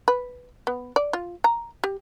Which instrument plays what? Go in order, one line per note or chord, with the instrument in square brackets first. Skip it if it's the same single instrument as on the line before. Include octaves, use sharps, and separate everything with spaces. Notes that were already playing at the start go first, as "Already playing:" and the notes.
[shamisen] B4
B3
D5
F4
A#5
G4